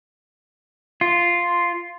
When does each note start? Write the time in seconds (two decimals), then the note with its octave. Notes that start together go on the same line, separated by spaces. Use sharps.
1.01 F4